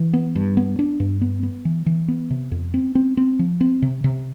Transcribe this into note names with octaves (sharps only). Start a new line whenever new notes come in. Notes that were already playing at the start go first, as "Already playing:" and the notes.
Already playing: E3
B3
G2
B3
D4
G2
B3
B3
E3
E3
B3
C3
F2
C4
C4
C4
F3
C4
C3
C3